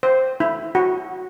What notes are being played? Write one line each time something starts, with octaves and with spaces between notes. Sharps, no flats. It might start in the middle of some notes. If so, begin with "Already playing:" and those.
C5
E4
F#4